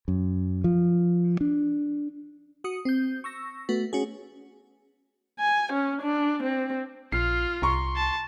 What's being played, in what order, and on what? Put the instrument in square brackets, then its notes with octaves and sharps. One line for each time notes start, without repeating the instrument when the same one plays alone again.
[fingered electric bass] F#2
F3
D4
[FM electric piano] F#4 D#6 C#7
C4 G6
C#6 E6 A#6
A3 B3 F#4
C#4 F#4 G#4
[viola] G#5
C#4
D4
C4
[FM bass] A#1 [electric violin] F4 [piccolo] F6 [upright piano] C7
[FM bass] C2 [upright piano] A#5 C#6 [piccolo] C6
[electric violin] A5